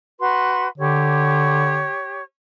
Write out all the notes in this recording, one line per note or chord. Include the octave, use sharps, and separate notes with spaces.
F#4 B4 C6
D3 G4 C#5